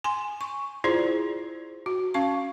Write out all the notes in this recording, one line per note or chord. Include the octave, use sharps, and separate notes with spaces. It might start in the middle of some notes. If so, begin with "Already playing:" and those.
G#5 C6
C#6
E4 F4 G#4 C5 D5
F#4
C#4 F5 C#6